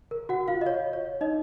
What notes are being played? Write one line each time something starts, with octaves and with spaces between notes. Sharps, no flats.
A#4
F#4 F#5
F4 F5
D#5
C#5
C#5
D#4 D#5